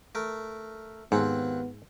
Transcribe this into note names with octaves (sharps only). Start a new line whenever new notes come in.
A3 A#4
D#2 G#2 B3 C4 F#5